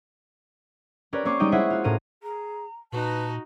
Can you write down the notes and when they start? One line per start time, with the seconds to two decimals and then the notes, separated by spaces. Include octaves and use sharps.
1.13 C#4 G4 A#4 B4 C#5 D5
1.25 A#3 C4 C#4 C#6 D6 C7
1.39 G3 G#3 D#4 G5 D#7
1.52 E4 G#4 C5 C#5 E5 F#5
1.70 F4 F#4
1.84 A2 C#4 A#4 D#7
2.23 G#4 A#5
2.92 A#2 D#4 F#4 B4 A5